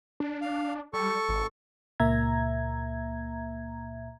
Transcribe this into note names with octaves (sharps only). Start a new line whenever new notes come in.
D4
F5
G3 A4 C#6
G#1
C#2 A#2 A#3 E5 A#5 G#6